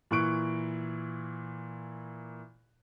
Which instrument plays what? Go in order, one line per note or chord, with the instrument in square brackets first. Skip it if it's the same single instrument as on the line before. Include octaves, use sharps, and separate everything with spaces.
[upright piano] A#2 E3 C#6 F#6 D7